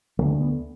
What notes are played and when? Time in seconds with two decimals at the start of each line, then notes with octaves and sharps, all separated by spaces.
0.19 D3 A3
0.22 D2
0.41 B3